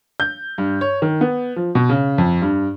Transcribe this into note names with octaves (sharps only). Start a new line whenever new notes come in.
G6
G2
C#5
D#3
B3
F3
B2
C#3
F2
G2